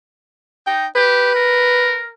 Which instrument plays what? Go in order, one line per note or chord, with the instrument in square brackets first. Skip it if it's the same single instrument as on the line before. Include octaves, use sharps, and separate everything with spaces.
[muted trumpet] D#4 [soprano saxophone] G5
[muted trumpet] G4 [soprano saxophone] B4
[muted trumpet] A#4